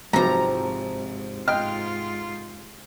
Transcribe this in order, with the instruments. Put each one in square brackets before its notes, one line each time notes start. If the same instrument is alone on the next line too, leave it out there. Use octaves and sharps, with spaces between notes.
[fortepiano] G#1 F#3 [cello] G#2 [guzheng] C3 F3 [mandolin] A#5
[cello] G#2 F4 [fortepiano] D#5 G5 [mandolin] F6